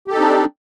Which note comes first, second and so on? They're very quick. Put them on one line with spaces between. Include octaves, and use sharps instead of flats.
G4 A4 D#4 C4 D4